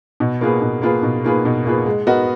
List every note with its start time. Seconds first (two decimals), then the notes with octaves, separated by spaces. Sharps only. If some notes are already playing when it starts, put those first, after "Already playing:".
0.20 B2
0.41 A#3 F4 G#4 B4
0.62 B2
0.82 A#3 F4 G#4 B4
1.03 B2
1.24 A#3 F4 G#4 B4
1.45 B2
1.65 A#3 F4 G#4 B4
1.86 G#3
2.07 B3 F#4 A#4 D#5